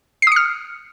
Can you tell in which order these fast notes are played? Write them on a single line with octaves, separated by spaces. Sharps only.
C7 D#6 C#7 F6